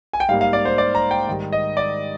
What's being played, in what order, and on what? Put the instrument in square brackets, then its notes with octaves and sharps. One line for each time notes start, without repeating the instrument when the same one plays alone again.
[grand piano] G#5
G5
G#2 G3 A#3 F5
F5
D5
C5
D5
A#5
G5
G#2 D#3 G3
D#5
D5